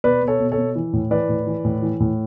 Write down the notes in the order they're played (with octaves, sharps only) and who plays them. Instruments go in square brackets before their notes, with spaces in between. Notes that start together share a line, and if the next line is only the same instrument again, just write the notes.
[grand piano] B2 B4 D5
B2
A4 C#5
B2
A4 C#5
B2
E3
A2
E3 B4 D5
A2
E3
A2
E3
A2